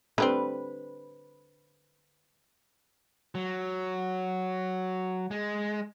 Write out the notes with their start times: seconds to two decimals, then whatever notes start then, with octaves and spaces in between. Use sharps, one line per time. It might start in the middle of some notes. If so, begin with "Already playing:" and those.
0.18 D3 G3 C4 B4
3.35 F#3
5.31 G#3